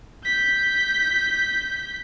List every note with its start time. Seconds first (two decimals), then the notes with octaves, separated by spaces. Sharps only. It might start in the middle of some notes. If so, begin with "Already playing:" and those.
0.24 G6 B6